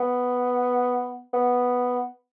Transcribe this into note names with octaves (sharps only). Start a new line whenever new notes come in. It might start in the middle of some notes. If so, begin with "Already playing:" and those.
Already playing: B3
B3